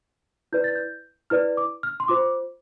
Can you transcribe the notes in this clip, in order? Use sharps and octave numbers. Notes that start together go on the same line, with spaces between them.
E4 B4 D5 G6
A6
G6
E4 B4 D5 F6
D6
F6
C6
F4 C5 D6